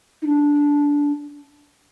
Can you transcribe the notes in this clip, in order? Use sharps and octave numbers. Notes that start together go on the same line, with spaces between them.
D#4
D4